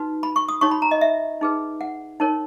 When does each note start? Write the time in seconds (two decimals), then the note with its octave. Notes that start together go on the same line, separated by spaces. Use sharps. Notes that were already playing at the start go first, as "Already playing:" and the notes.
Already playing: D#4 F#4 B4
0.23 B5
0.36 C#6
0.49 D#6
0.61 D#4 F#4 C#5 C#6
0.71 B5
0.82 A#5
0.91 D#5
1.01 E5
1.41 D#4 G#4 B4
1.81 F#5
2.20 D#4 A#4 C#5